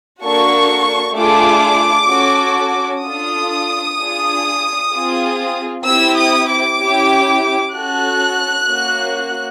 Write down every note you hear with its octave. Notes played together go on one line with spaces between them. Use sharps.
A#3 D4 F#4 A4 C#6
A3 D4 F4 G#4 D6
C#4 F#4 A4
D4 F4 A4 D#6
D4 F4 G#4
C4 F4 G#4
C4 E4 G4 E6
D#6
D6
C#4 E4 G4
C#4 F#4 A4 F#6
A#3 C#4 F#4